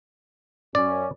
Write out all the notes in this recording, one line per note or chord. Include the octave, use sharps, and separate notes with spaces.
F#2 C#4 D5